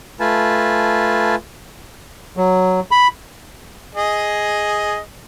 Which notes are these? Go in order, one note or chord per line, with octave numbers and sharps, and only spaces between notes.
A3 F4 B4 G#5 A5
F#3
B5
G#4 D#5